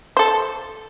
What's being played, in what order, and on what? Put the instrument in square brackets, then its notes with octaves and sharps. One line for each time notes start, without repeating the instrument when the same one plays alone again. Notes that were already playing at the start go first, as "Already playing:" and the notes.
[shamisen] A4 C5